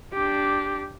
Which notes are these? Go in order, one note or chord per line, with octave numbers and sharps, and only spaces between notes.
D4 G4